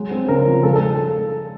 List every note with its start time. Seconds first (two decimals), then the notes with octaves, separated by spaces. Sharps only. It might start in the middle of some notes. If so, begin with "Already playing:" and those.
Already playing: F#3 G#3
0.11 C4
0.28 C#3 A#4
0.46 F3
0.63 G#3 A4
0.76 A4